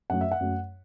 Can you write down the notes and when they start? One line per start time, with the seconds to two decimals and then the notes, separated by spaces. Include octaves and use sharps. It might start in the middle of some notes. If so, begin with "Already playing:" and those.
0.10 F#2 F#3 A3 F#5
0.21 E5
0.32 F#5
0.40 F#2 F#3 A3